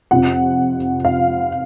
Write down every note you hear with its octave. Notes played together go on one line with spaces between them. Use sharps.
F2 C3 F3 F#5
F5